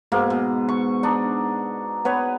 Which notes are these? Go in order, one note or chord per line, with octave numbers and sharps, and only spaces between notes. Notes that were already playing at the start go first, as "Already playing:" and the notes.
G#2 B2 A#3
B2
C#6
D4 D#4
B3 B4 C#5